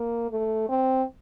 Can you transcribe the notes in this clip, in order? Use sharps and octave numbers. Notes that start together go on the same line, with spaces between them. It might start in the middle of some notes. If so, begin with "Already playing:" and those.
Already playing: A#3
A3
C4